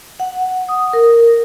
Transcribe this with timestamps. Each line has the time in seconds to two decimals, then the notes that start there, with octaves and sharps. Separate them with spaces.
0.20 F#5
0.69 D#6
0.93 A#4